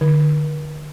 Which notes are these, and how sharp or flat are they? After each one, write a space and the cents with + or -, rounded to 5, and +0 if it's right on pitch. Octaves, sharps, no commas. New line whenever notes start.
D3 +30